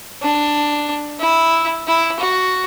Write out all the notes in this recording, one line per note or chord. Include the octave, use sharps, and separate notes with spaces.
D4
E4
E4
F#4